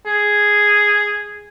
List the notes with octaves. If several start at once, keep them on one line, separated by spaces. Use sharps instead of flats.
G#4